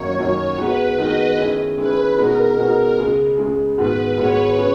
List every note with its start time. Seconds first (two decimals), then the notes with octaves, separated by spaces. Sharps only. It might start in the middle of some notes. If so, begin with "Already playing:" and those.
Already playing: F#2 D#3 F#3 A#3 D#4 C#5
0.18 F#2 D#3 F#3 A#3 D#4
0.58 D#3 G#3 B3 D#4 F#4 B4
0.97 D#3 G#3 B3 D#4 F#4 D#5
1.38 D#3 G#3 C#4 E4
1.78 D#3 G#3 C#4 E4 B4
2.18 B2 G#3 D#4 F#4 A#4 B4
2.58 B2 G#3 D#4 F#4 B4
2.98 C#2 C#3 G#3
3.38 C#2 C#3 G#3
3.78 G#2 D#3 G#3 B3 F#4 B4
4.18 G#2 D#3 G#3 B3 F#4 C#5
4.58 C#3 G#3 C#4 G#4